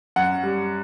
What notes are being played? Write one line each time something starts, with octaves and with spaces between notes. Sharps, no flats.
F#2 F#5
G3